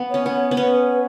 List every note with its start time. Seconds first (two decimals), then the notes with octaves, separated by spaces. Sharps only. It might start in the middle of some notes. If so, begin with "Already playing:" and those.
Already playing: B3
0.10 C#4 C#5
0.26 B3
0.51 B3
0.57 C#4 B4